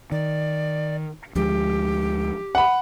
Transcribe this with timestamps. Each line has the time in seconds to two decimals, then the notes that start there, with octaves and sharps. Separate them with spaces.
0.12 D#3 D5
1.35 D2 F3 G#3 G4
2.55 F#5 B5